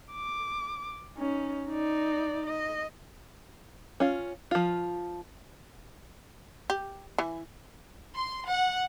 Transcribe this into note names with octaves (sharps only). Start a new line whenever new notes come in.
D6
C#4 D#4
D#4 D5
D#5
C#4 F4
F3 F4
G4
E3
C6
F#5